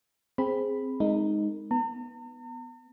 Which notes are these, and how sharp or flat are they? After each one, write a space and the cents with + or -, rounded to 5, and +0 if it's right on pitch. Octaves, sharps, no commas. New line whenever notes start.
C4 +0 G#4 +0 B5 +0
G#3 +0 D#4 +0 A#4 -35
B3 +0 A#5 -45